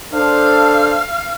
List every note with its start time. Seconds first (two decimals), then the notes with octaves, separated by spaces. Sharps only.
0.14 D4 A4 C5 F5